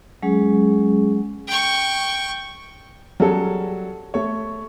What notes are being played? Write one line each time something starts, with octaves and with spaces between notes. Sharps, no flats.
F#3 G#3 C#4 G#4
G5 C#6
F#3 G3 C#4 G#4 A4
A3 C#5